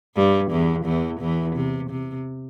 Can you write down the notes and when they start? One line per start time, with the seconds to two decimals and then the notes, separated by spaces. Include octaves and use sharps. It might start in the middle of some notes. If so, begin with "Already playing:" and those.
0.16 G2 G3
0.51 E2 E3
0.85 E2 E3
1.21 E2 E3
1.56 C3
1.90 C3